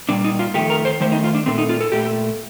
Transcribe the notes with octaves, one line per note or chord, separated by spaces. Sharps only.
A#2 G3 A#3 D4
D#4
F4
F2 D#3 A3 G4
A#4
C5
F2 D#3 A3 C5
D#4
F4
D4
A#2 A3 C4
D#4
F4
A4
A#2 A3 G4